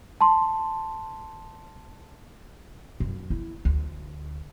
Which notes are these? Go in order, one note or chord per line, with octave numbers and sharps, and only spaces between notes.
A5 C6
F#2
E4
D2